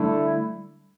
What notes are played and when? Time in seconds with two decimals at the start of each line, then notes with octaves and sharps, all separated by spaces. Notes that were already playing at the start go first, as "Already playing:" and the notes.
Already playing: D3 G3 A3 E4